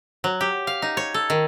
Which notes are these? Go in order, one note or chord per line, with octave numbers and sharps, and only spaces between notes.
F#3
G4
F5
D#4
C#5
A4
D#3